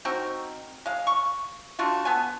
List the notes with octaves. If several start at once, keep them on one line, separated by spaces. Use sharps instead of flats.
C4 D#4 F#4 A#4
G#3 F5
C#6
A3 D4 F4 F#4
B3 A4 G#5